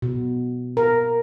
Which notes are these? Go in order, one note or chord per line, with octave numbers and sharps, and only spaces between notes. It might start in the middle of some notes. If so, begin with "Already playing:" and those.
B2
A#4